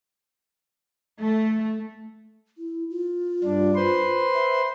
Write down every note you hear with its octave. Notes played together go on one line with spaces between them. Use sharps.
A3
E4
F4
G2 D4
B4 C5 C6
E5